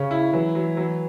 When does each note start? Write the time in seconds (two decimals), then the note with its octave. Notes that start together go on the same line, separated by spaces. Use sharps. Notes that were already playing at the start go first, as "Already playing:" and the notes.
Already playing: C#3 C#4
0.11 E4
0.33 E3 F#3
0.55 F#3
0.77 F#3